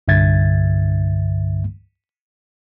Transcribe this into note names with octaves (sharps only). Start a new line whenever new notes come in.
C2 G2 D3 E5 G#6 A6